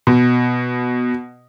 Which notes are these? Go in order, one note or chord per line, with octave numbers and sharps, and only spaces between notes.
B2